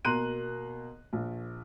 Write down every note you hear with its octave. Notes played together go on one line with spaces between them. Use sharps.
B2 A#3 A#5 C6 F#6 D#7
A#1